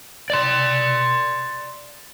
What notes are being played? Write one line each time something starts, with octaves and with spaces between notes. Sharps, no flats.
D5 C6